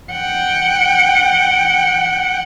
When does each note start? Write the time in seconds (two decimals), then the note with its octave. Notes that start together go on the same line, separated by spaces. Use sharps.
0.12 F#5 G5